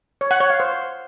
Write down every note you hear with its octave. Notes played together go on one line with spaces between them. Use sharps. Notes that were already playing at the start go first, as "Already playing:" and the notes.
C#5
F#5
C#5
F5
C5